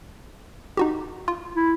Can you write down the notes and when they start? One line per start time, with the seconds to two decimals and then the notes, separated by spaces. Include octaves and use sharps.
0.77 D#4 F#4 G4
1.28 F4
1.55 E4